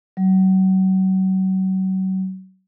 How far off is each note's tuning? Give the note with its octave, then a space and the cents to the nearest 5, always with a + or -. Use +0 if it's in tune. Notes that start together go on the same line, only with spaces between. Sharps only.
F#3 +35